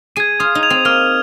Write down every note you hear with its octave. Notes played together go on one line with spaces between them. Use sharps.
G#4 G#6 D#7
F4 D#6
D#4
G#6 F7
C4
A#3 F6